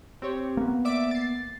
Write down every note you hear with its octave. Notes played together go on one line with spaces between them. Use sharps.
C4 G4 C#5
A#3 B3
D5 E5 D6
A6 C7